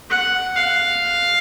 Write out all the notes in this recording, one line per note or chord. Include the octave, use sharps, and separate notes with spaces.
F#5
F5